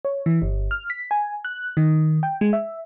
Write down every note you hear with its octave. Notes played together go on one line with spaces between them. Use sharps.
C#5
E3
G1
F6
B6
G#5
F#6
D#3
G5
G#3
E5